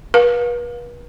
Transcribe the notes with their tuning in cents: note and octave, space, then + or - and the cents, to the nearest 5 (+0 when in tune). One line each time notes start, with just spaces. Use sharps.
B4 -40 F5 +25